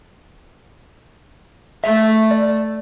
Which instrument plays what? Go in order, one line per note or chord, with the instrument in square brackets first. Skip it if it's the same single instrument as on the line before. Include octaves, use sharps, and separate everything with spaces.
[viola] A3 [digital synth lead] E5
[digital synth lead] D5